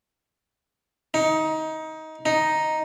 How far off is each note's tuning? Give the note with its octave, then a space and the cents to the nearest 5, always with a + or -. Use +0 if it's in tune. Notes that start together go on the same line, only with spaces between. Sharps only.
D#4 +20
D#4 +0